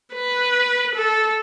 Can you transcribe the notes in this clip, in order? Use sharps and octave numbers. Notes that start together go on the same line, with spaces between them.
B4
A4